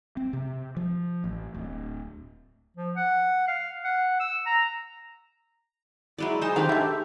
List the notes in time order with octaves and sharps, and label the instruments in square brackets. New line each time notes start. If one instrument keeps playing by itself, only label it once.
[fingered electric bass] C4
C3
F3
A1
D1
[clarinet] F3
F#5
F5
F#5
E6
A#5
[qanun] F#3 G#3 D5 [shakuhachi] E4
[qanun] D#4 C5 A5 [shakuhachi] G#4
[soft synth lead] D#3 [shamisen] A3 C4 D4 [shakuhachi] G4 [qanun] G#4 B4 F5
[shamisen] D3 G#3 A3 [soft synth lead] E5